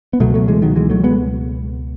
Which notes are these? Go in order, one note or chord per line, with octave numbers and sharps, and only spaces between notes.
B3
C#2 B2 F#3 A3
F#3 A3
E3 G#3
D#3 F#3
E3 G#3
F#3 A3
G#3 B3